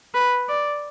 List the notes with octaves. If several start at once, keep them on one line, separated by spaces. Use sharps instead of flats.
B4
D5